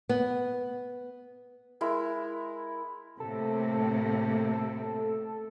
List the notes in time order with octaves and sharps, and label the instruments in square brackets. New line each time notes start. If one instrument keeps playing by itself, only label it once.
[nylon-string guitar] B3
[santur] G#3 E4 A#4
[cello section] A2 C3 A#3 [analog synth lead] A4